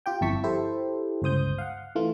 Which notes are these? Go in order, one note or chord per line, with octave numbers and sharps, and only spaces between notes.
F4 G4 G5
G1 F2 E4 A5 C#6 B6
E4 G4 A4 C5
G1 C#2 C5 D#6 G6
F5 F#5
E3 A3 F4